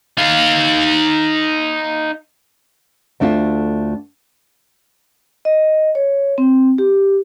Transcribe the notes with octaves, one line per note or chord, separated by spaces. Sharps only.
D#4 F5
D2 A3 D4 F4 E5
D#5
C#5
C4
G4